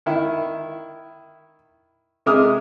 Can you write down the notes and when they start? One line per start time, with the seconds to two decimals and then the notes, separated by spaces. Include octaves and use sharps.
0.06 D#3 E4
2.26 C3 G#3 E5 D6 D#6 F6